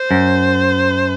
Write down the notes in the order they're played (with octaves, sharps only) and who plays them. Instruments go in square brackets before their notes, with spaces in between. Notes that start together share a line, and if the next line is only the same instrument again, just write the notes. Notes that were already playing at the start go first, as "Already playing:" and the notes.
Already playing: [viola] C5
[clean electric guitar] F#2